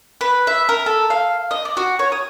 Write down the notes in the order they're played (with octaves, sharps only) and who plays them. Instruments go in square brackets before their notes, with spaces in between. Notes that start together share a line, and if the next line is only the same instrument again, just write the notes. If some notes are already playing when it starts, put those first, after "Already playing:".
[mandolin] B4
E5
A#4
A4
F5
D#5
D5
F#4
C#5
D#6